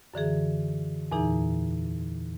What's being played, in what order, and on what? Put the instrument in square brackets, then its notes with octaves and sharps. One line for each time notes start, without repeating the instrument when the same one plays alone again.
[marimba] F#2 D3 E3 G#4
E2 A#2 E3 D#4 G#4 A#5